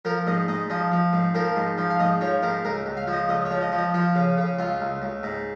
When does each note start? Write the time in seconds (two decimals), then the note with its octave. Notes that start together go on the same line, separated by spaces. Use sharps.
0.05 F3 A#4
0.27 G#2 D#5
0.48 G#2 D#5
0.70 F3 D#5
0.92 F3
1.13 G#2
1.35 F3 A#4
1.56 G#2
1.78 F3
1.90 F5
2.00 G#2 D#5
2.21 F3 C#5
2.43 G#2 A#4
2.65 C#2 A#4
2.86 C#2
2.97 F5
3.07 F3
3.13 D#5
3.29 C#2 D#5
3.45 C#5
3.51 F3
3.62 D#5
3.72 F3
3.78 D#5
3.94 F3 F4
4.15 C#3
4.37 C#3
4.59 C#2 F4
4.81 C#2
5.02 C#2
5.23 G#2